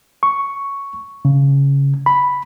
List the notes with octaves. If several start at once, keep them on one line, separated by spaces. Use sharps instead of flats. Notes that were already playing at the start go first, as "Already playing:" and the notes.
C#6
C#3
B5